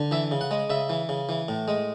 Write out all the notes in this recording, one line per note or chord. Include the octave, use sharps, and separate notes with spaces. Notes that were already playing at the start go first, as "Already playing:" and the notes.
Already playing: D3
E3 E5
C#3
F#5
G#3
C#3 E5
E3
C#3
E3
A2
G#3